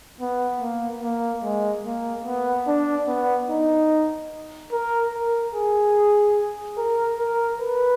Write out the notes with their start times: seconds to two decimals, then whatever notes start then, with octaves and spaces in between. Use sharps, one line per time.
0.20 B3
0.61 A#3
1.03 A#3
1.43 G#3
1.85 A#3
2.25 B3
2.67 D4
3.08 B3
3.50 D#4
4.72 A#4
5.13 A#4
5.54 G#4
6.78 A#4
7.19 A#4
7.60 B4